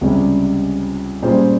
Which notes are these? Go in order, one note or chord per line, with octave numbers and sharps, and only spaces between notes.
C#2 C3 G3 C#4 G#4
A#2 G3 C#4 G#4 C5